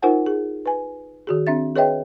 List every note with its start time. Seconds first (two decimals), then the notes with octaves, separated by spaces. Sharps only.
0.02 D#4 F4 A#4 C5 F#5 G#5
0.26 G#4
0.66 B4 G#5
1.27 D#3 F#4 G#4
1.47 C4 D4 E5 A6
1.76 G#4 B4 C#5 D#5 E5 G5